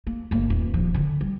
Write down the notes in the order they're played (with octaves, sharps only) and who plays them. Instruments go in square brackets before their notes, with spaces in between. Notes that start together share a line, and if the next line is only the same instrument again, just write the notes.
[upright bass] A#3
G1 A#3
D#1
F3
D3
G3